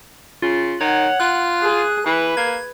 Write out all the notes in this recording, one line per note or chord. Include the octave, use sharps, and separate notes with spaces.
C#3 F4
D#3 C#5 F#5
F4 F#6
G#4
E3 B4
A#3 G#6